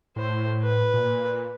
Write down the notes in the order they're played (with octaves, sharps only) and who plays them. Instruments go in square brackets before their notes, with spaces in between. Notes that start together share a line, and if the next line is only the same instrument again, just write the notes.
[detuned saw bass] A2 [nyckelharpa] C5
[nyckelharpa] B4
[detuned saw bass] A#2